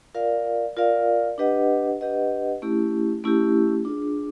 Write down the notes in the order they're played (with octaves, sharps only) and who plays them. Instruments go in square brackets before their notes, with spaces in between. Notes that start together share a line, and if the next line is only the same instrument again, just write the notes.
[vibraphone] F4 A#4 D5 F5
F4 A#4 D5 F5
D4 G4 B4 D#5 F#5
D4 G4 B4 D#5 F#5
A3 C#4 E4 G4
A3 C#4 E4 G4
D4 F4 G#4